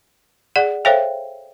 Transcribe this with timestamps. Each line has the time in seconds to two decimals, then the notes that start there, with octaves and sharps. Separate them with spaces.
0.56 G#4 D5 F#5
0.85 A4 C5 C#5 E5 F5 G5